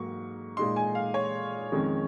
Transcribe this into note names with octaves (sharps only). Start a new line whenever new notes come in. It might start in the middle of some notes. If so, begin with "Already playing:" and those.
Already playing: G#2 F#3 A#3 C#6
A#2 G#3 D#4 C6
G#5
F5
C#5
F2 D#3 G#3 C#4